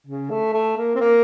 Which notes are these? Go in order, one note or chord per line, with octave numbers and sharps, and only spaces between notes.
C#3
A3
A3
A#3
C4
A#3